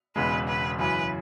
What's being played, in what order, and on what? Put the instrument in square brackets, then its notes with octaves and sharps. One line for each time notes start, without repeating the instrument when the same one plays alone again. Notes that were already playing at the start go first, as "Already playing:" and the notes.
[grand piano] E1 E2 C#3 G#3 [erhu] B4
[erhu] B4
[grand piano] F#2 C#3 E3 [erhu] B4